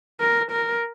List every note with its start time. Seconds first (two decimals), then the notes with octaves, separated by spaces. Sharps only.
0.20 A#4
0.51 A#4